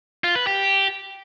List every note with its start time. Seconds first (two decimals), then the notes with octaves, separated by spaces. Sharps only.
0.24 F4
0.36 B4
0.47 G4